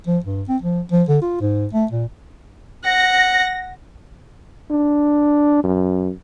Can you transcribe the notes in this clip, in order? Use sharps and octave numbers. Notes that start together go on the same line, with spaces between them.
F3
G2
C4
F3
F3
D3
F4
G#2
A3
A#2
F#5 A#6
D4
F#2